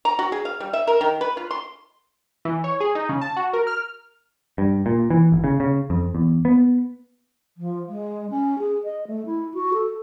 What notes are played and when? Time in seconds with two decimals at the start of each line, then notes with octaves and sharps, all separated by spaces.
0.05 A#5
0.19 F#4
0.32 G#4
0.45 F5
0.60 G3
0.73 E5
0.87 A#4
1.01 D#3
1.21 B4
1.37 F4
1.51 C6
2.45 E3
2.64 C#5
2.80 G#4
2.95 D#4
3.09 C#3
3.21 A5
3.36 F#4
3.53 A#4
3.67 F6
4.58 G2
4.86 A#2
5.10 E3
5.32 G#1
5.44 C#3
5.60 C#3
5.90 F2
6.15 E2
6.45 B3
7.57 F3
7.89 G#3
8.30 C#4
8.59 G#4
8.84 D#5
9.07 A3
9.26 E4
9.54 F#4
9.74 A4